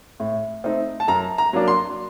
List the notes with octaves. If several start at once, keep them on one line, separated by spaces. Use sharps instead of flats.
A2
A3 C4 D#4
A5
F#2 A#5
A#5
F#3 A#3 D4
C6